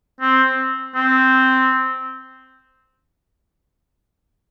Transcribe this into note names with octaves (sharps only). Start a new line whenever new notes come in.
C4
C4